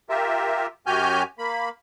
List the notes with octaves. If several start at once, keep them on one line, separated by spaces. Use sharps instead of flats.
F4 G4 A#4 E5
F#2 F#4 G4 G#5 F6 G6
A#3 B5